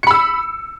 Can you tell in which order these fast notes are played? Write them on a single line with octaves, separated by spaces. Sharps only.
C#7 B5 E6